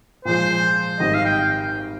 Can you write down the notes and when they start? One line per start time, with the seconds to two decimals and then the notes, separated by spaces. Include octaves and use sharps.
0.25 A#2 F3 G#3 C5
0.99 G#1 G#2 D#3 G3 D#5
1.14 F5
1.25 G5